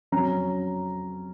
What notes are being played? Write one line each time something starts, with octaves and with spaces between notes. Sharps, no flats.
F2 C#3 F#3 C#4 A#5